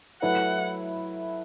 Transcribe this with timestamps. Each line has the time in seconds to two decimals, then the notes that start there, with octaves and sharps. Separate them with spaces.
0.22 F#3 A3 E4 B4 F#5